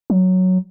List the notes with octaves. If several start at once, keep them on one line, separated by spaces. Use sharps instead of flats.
F#3